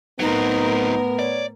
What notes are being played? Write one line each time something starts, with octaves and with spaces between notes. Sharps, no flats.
A2 F#3 B3 C4 D#4 A#4
C#5 D5